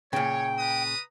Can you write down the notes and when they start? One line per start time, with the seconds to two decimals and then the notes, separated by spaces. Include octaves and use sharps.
0.13 A#2 C#3 C#5 G5
0.58 B4 A#5 D#6